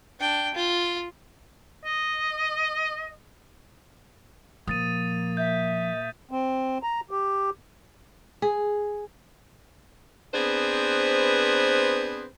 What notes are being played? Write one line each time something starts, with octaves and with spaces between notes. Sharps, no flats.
D4 G5
F4
D#5
A#2 F3 A#3 D#6 A6 D#7
E5 G6
C4
A#5
G4
G#4
B3 C4 D4 G#4 B4 C5